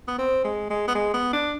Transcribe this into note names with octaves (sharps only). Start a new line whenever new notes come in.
B3
C4
G#3
G#3
B3
G#3
B3
D4